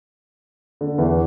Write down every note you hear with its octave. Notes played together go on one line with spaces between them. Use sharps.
D3
E2 E3